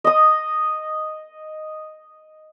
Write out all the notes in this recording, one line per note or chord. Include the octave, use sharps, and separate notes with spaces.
D#5 D#6